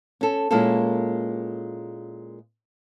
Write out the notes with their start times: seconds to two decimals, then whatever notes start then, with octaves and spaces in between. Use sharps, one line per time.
0.21 C#4 A4
0.51 A#2 G#3 A#3 C#4 E4 A4